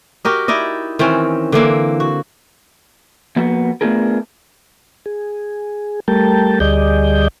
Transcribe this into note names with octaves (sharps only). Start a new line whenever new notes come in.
F#4 G4 A#4 D#5
D#4 E4 D5 D#5
D#3 E3 C4 C#4
D3 E3 A#3 C4
F#4
F3 A#3 B3 F#4
A3 B3 D4 F4 G#4 A#4
G#4
G3 A3 A#4 G5 A5
D2 G3 G#4 D5 D#5 G6